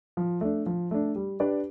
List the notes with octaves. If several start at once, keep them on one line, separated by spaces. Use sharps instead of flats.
F3
A3 D4
F3
A3 D4
G3
D4 G4 B4 D5